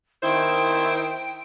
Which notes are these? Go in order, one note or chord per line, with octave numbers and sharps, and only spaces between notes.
D#3 E4 C5 G5